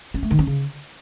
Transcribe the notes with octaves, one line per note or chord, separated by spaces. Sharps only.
C#4
A3
D#3
C#4
C#3